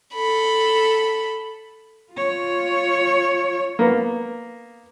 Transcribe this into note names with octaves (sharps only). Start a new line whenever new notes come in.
A4 B5
F4 C#5
A#3 B3